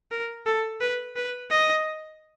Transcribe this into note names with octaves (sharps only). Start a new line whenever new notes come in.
A#4
A4
B4
B4
D#5